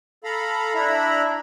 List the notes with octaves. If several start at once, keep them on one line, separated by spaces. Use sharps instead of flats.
A4 F5 A#5 B5
D4 E4 E5 A#5 B5